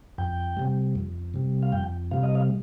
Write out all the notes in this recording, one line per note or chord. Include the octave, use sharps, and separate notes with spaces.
F2 G5
C3 G3
F2
C3 G3
F5
F2 G5
C3 G3 F5
D#5
F5